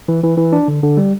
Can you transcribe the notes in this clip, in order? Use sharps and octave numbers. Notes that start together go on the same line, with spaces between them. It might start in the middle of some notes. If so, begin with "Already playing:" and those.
E3
E3
E3
D4
D3
D3
G3